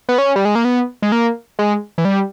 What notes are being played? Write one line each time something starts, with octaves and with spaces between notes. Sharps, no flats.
B3
C#4
G3
G#3
A#3
B3
G#3
A#3
G#3
E3
G3